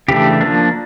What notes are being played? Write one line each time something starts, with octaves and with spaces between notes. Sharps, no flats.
C#3 E3 A3 D4 G4
F3 A#3 D4